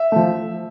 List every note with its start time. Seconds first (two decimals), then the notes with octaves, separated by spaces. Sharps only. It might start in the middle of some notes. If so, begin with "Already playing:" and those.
Already playing: E5
0.12 F3 A3